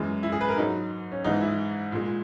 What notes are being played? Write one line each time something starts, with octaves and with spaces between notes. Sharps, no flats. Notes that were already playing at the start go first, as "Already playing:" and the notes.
Already playing: F#2 E3 G#3
E4
G#4
B4
A#4
G#2 F#3 D#4
C#4
G#2 E3 G#3 D#4
E4
A#2 G#3